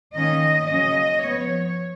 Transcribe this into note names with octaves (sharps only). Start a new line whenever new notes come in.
D#3 A#3 C#4 D#5
C#3 F#3 A#3 C#4 D#5
F3 B3 C#5